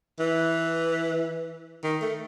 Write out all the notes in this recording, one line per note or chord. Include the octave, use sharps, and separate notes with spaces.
E3
D#3
A3